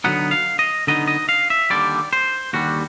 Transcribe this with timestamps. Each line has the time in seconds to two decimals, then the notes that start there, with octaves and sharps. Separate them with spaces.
0.04 D3 F#3 B3 D#4 F#5
0.31 F5
0.59 D#5
0.87 D3 F#3 B3 D#4 D#5
1.08 D#5
1.29 F5
1.50 E5
1.70 D#2 D3 G3 D5
2.13 C5
2.53 D#2 D3 G3 F#4